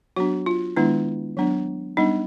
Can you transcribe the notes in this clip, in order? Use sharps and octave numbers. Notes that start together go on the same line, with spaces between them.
F#3 B3 D4 F#4
F4
D#3 G#3 B3 D4 E4
F#3 B3 D4
G3 B3 D4 D#4